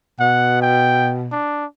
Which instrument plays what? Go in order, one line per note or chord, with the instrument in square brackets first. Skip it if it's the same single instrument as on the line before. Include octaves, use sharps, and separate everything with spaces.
[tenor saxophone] B2 [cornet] F#5
[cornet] G5
D4